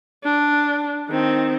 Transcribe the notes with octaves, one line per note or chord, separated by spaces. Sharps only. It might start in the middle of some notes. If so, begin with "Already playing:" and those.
D4
D#3 C4